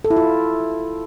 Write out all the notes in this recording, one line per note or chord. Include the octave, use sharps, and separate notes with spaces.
A4
E4
F4